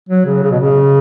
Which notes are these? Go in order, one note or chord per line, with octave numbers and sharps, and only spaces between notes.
F#3
C#3
C#3
B2
C#3